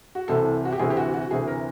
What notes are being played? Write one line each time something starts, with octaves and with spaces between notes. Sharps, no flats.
F#4
C2 C3 E3 A4
F#4
G4
D2 C3 E3 G#4
G4
F#4
F#4
D2 C3 E3 G#4
A#4